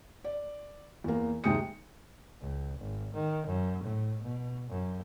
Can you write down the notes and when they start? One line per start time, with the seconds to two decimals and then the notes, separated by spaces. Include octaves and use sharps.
0.24 D5
1.04 E2 A#3
1.44 D#2 C3 G#3 G5 D#6 C#7
2.41 C#2
2.79 G#1
3.15 D#3
3.47 F#2
3.84 A2
4.23 B2
4.70 F#2